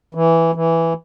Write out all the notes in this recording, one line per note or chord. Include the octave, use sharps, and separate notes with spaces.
E3
E3